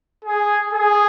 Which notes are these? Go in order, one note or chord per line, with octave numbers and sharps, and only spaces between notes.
G#4
G#4